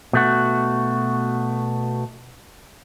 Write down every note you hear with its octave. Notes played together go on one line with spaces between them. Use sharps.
B2 A3 F#4